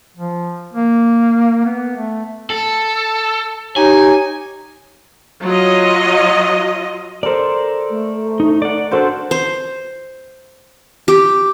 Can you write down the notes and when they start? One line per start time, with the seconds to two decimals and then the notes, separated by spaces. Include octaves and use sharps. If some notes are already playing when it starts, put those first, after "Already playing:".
0.17 F3
0.73 A#3
1.66 B3
1.97 A3
2.50 A4
3.76 D#4 G4 C#5 G#5
5.42 F#3 F4 D#5
7.23 A4 A#4 C5 D5
7.90 A3
8.40 D#4
8.62 D5 F#5
8.91 D4 F#4 A4 A#4 C5
9.31 C5
11.08 G4